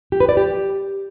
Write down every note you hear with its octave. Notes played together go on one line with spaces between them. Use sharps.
G4
B4
D5
G4